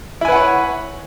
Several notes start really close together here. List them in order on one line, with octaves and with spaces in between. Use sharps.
E4 G#5 B4 F#5 C#5